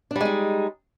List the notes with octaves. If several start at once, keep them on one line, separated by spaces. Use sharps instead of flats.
G3 G#3 D4 D#4